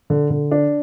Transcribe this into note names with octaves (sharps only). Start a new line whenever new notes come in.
D3
D3
D4